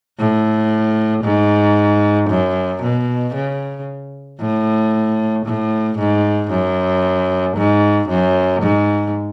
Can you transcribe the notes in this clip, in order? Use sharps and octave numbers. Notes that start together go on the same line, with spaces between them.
A2
G#2
F#2
B2
C#3
A2
A2
G#2
F#2
G#2
F#2
G#2